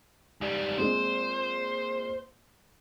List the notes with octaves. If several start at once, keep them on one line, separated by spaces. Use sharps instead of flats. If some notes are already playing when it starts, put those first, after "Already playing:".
G#2 G3
A#2 G#3 C4 C5